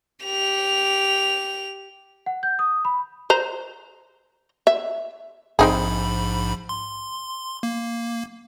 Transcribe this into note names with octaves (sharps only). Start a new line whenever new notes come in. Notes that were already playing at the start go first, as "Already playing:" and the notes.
G4 F7
F#5
G6
D#6
B5
C5 A#5
E5
A#1 G#2 C4 D#4 G#4 B5
C6
A#3